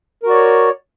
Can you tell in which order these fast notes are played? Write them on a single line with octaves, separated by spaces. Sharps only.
A#4 F#4 D5 C#5